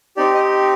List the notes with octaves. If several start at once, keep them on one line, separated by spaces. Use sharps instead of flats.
C4 D#4 G4 D5
D#5